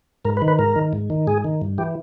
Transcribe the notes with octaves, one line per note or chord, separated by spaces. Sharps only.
G#2 A#4
B4
D#3
B4
G#2 A#4
D#3
G#2
D#3
G#2 G#4
D#3
G2
E3 G4